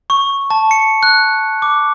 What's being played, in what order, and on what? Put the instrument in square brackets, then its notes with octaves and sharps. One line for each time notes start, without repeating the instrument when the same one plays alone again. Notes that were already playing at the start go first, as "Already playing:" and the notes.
[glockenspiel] C#6
A5
C#7
F#6
D6